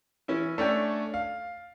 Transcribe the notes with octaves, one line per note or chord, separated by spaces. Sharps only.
E3 C#4 E4
A3 C#4 D4 D5 G5
F5